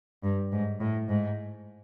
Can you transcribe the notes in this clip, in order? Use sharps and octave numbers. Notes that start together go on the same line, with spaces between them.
G2
G#2
A2
G#2